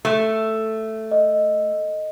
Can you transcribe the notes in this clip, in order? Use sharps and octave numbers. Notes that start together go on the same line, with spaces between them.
A3
D#5